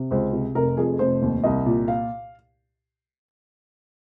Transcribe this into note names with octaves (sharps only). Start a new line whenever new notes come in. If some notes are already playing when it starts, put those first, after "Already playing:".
Already playing: C3
C#2 C5
C3
F1 A#4
F2 G#4
F1 C5
D#2
C2 D#5
A#2
F5